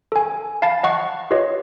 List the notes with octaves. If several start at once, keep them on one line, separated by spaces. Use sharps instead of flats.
A4 G#5
F5 A5 B5 A6
D#5 F#5 C#6
F4 G4 B4 C#5 D#5